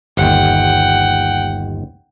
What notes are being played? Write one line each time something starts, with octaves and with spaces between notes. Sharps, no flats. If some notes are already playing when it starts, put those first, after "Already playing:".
G1 D#2 F#5 G5